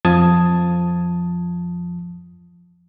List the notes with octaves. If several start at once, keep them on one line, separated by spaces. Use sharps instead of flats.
F2 F3 A5 D#6 G#6